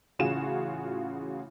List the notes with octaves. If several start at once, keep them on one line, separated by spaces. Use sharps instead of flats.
A1 C#3 F4 F#4 G#4 E7